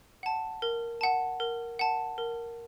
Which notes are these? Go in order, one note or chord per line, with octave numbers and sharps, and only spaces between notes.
F#5 A5
A#4
F#5 A5
A#4
F#5 A5
A#4